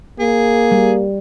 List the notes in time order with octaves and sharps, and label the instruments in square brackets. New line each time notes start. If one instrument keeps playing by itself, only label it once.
[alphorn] A#3 [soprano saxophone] G#4
[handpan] G3